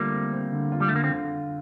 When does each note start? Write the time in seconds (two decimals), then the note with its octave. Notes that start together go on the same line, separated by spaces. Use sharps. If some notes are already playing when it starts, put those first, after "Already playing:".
Already playing: D3 G3 A3 A#3 C4 F4
0.13 C4
0.33 C4
0.52 D3
0.72 F4
0.80 G3
0.88 A3
0.92 D3 A#3
1.04 C4
1.11 D3